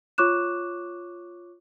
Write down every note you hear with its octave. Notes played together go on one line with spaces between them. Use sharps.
F4 C#5 C#6 D6 F#6 E7